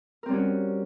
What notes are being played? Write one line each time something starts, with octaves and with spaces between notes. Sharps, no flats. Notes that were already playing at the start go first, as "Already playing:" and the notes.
G3 C4 C#4 F#4 A#4